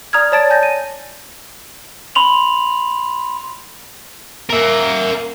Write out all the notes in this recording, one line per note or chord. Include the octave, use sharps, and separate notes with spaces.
D5 A#5 D#6 F6 G#6
C#5 D5 A5 A6 D7
G#5 G6 A6 A#6
D#7
B5 C6 F7 F#7
A#3 A#4 E5